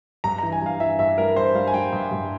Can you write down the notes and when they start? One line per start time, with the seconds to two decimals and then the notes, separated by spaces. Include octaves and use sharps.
0.24 G2 A#5
0.38 A#5
0.43 E3
0.52 G#5
0.62 G2 F5
0.80 E3 E5
0.99 G2 E5
1.18 G3 A#4
1.36 G2 C5
1.55 G3 F5
1.68 G#5
1.74 G3 G5
1.92 G2
2.11 G2